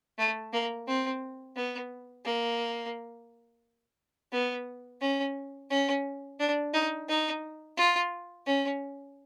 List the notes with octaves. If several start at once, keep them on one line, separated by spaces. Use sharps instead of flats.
A3
A#3
C4
B3
A#3
B3
C#4
C#4
D4
D#4
D#4
F4
C#4